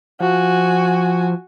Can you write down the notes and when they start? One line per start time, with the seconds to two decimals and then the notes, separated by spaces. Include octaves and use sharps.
0.20 F3 F#4 G#5